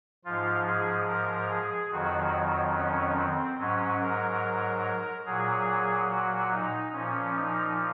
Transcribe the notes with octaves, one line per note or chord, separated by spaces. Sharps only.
G#2 F3 F4
G#4
A#4
G#4
F2 D#3 F#3 F#4
C#4
C4
G#2 F#3 C#4
A#4
A#2 F#3 G#4
F#4
D#4
A#2 F3 C#4
D#4